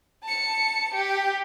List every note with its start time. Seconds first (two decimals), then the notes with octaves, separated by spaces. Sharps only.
0.24 A5 C#7
0.95 G4